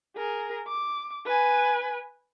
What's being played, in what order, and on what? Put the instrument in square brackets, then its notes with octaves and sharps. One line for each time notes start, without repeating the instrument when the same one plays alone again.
[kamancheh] G#4 A#4
D6
B4 G#5